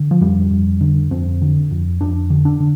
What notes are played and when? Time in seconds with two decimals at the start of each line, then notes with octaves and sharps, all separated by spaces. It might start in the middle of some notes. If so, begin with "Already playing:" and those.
Already playing: D3
0.11 F3
0.21 F2 G3
0.51 F2
0.81 D3
1.11 F2 C4
1.42 D3
1.71 F2
2.01 F2 D4
2.30 D3
2.45 D4
2.60 D3